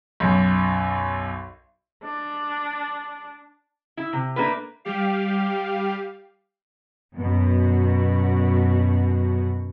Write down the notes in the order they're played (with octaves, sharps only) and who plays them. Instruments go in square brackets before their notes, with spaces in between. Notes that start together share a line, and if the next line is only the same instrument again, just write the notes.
[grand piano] B1 F#2
[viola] D4
[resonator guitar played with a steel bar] E4
C3
A3 A#3 D4 F4 B4
[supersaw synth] G3 G4 F5
[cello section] F#2 B2 F#4